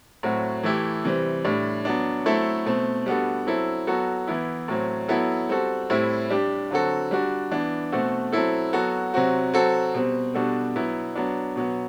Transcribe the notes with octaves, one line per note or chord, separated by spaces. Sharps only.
A2 F#3 C4 F#4
E3 A3 E4 G4
C3 E3 G3 C4
A2 G3 D4
F#3 B3 D4
F#3 A3 C4 E4 A4
B2 A3 C4
G3 B3 D4 F#4 A4
F#3 C4 E4 A4
F#3 B3 F#4 A4
E3 B3 E4
A2 F#3 C4
F#3 B3 E4 A4
G3 C4 F#4 A4
A2 G3 C4 E4
G3 D4 G4
D3 F#3 C4 F#4 A4
G3 D4 F#4
E3 B3 D4
B2 A3 C4 F#4 A4
F#3 C4 E4 A4
F#3 B3 F#4 A4
C3 F#3 C4 F#4
F#3 C4 F#4 A4
B2 G3 C4
B2 G3 D4 F#4 A4
B2 F#3 B3 E4
F#3 B3 D4
B2 F#3 B3